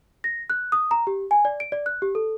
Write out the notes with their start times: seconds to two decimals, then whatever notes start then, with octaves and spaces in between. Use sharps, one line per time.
0.24 A#6
0.50 F#6
0.72 D#6
0.91 A#5
1.07 G4
1.31 G#5
1.45 D5
1.60 D7
1.72 D5
1.86 F#6
2.02 G4
2.15 A4